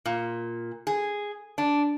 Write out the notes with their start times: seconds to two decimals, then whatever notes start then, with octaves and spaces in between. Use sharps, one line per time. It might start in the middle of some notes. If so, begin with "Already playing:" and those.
0.05 A#2
0.87 G#4
1.58 D4